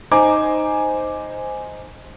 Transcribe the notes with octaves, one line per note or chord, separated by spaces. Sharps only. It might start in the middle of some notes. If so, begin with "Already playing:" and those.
D#4 C5 G#5 A#5 D6